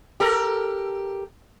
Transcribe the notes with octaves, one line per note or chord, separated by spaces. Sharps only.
G4 A4 A#4